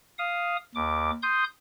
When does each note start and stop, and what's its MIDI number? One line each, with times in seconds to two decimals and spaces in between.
0.18 0.57 77
0.18 0.57 87
0.75 1.11 39
0.75 1.11 86
1.23 1.44 84
1.23 1.44 87
1.23 1.44 91